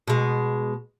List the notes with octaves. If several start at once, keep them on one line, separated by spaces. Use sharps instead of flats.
B2 G#3